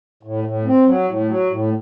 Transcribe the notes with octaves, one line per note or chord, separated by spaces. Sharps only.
A2
A2
C4
F#3
A2
F#3
A2